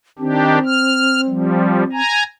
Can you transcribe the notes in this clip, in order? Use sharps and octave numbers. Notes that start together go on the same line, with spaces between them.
D#3 C4 D4 G4
F6
F3 G3
G#5 A#5